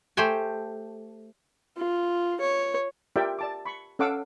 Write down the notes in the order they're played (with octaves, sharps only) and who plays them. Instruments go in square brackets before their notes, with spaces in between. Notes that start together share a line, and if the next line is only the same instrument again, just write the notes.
[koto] A3 G4 C5 G5 G#5
[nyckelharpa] F4
C#5
[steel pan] F4 G4 A#4 D5 E5 G5
D5 A5 D6
B5 C#6
C#4 A4 F5 F#5 D6 E6